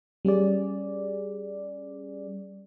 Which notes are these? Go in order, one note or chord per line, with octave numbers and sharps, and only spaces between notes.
G3 C#4 G#4 D5